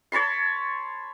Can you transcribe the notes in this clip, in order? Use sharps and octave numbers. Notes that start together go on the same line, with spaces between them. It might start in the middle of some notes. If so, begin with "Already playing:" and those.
C#5 A5 B5 C6